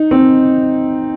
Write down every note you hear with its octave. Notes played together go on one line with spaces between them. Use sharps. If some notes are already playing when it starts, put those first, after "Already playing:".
Already playing: D#4
C4